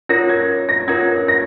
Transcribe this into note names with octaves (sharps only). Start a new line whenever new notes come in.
C#4 F4 A#4 C#5 A#6
G#6
A#6
C#4 F4 A#4 C#5 G#6
A#6